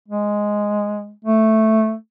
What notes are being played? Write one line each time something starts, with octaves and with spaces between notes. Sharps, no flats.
G#3
A3